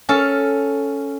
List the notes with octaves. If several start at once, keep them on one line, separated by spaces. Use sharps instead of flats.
C#4 A4 F5 A5